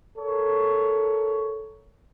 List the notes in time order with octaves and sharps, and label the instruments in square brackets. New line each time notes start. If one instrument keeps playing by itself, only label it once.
[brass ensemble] A4 A#4 C#5